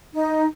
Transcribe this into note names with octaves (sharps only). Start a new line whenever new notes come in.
D#4